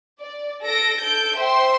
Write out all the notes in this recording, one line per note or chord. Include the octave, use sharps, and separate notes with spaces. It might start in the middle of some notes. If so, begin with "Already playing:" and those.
D5
A4 A#6 D7
A4 G6 D7
C5 E5 G5 C6